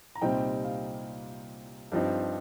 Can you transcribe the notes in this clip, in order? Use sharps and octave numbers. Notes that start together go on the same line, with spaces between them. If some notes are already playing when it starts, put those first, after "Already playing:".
A#5
C2 A#2 G3 C4 D#4 G5
F5
G2 F3 C4 D#4